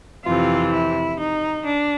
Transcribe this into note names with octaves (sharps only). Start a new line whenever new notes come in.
F2 C3 E3 F4
E4
D#4
D4